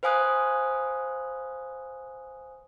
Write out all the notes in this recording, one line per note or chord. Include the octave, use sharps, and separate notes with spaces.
B4 C5 F5 G#5 D#6 F#6